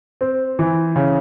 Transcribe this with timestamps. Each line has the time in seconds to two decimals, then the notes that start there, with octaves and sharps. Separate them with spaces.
0.21 C4
0.59 E3
0.96 C#3